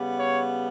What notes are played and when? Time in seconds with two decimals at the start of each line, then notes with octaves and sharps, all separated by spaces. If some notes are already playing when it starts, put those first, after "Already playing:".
Already playing: C#3 G3 B3
0.18 C#5